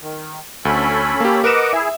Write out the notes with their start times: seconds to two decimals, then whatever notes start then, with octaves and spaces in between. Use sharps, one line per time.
0.02 D#3
0.65 D2 C#4 A4 B5
1.20 A#3 G4
1.44 A#4 B4 D#5 F#5 D6 E7
1.73 E4 G#4 E5